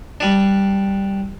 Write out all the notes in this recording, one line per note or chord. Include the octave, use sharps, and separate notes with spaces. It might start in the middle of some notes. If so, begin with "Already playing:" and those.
G3 D4